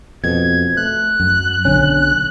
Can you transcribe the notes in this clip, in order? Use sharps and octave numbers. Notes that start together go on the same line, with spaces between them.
F2 B2 G#6
A3 F#6
F#2
B1 D3 C#4